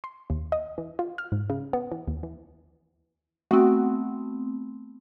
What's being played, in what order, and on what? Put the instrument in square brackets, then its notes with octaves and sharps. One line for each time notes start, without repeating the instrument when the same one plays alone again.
[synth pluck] C6
D#2
D#5
E3
F4
F6
G#2
C#3
B3
E3
D#2
E3
[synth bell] A3 B3 C4 [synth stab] F#4